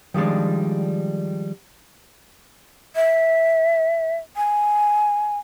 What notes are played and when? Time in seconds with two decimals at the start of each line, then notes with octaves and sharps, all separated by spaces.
0.14 D#3 F3 G3 G#3 D4
2.96 E5
4.37 G#5